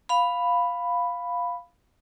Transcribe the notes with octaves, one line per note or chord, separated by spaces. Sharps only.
F5 B5